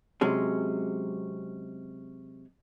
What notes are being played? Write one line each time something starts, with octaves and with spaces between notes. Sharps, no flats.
C3 F#3 G#3 C#4